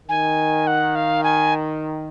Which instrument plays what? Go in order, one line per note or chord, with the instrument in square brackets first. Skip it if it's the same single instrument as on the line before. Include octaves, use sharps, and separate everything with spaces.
[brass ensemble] D#3 [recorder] G#5
[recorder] F#5
F5
G#5